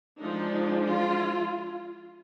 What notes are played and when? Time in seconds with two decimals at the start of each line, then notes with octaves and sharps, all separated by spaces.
0.19 F3 G#3 D4 D#4
0.84 F4